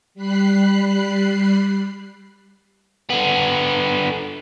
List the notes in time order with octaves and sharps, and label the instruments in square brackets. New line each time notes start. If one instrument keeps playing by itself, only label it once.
[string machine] G3 B5 F#6 C7
[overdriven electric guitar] D3 B3